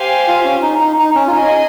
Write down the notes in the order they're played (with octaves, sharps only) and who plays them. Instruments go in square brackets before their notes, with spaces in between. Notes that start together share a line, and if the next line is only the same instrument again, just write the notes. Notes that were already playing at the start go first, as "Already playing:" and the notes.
Already playing: [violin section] G4 C5 F5 G#5
[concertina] F4
C#4
D#4
D#4
D#4
C#4
F4
[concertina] D#4 [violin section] G#4 D#5 G#5
[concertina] C#4